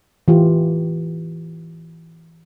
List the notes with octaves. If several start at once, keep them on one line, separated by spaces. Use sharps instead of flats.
E3 F4 G4